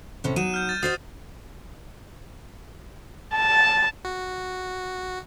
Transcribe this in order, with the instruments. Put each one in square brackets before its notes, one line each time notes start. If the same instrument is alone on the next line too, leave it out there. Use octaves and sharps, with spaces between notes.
[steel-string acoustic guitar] A2 C3 C#4
[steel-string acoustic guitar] F#3 D#4 [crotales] D#7 E7
[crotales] F6 G6
A6
[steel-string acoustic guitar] F#4 C5 D#5 [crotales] D#6 A6 C7
[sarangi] A5
[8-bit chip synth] F#4